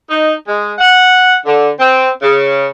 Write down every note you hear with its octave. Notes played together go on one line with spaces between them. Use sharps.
D#4
G#3
F#5
D3
C4
C#3